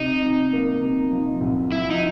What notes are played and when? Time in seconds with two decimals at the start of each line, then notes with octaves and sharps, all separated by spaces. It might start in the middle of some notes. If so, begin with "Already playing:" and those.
Already playing: C3 D#4
0.22 C3
0.53 A#3
0.82 C3
1.11 F3
1.41 C2
1.72 F3 E4
1.91 D#4